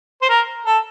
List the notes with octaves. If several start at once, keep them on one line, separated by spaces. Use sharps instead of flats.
C5
A#4
A4